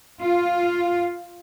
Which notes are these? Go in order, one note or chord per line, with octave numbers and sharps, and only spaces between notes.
F4